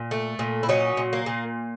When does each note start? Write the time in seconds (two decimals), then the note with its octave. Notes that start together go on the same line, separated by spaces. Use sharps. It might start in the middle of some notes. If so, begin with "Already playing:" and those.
Already playing: A#2
0.11 A3
0.39 A#2
0.63 E4
0.69 F#3 C#4 D#4
0.97 A#2
1.13 A#3
1.26 A#2